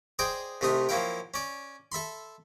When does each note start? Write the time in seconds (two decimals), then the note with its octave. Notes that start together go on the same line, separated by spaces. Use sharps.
0.19 G#4 C5 D5 D#5 G5
0.61 C2 C3 A3 D#4 D#6
0.89 F3 F#3 A#3 E4 F5 G5
1.34 C#4 D5
1.92 A4 E5 B5 C6